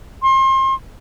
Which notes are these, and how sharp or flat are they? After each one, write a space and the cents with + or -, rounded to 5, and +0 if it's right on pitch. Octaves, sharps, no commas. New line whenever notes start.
C6 +35